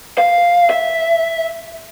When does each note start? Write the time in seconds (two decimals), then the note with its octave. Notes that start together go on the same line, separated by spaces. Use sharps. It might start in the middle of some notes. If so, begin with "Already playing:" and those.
0.18 F5
0.70 E5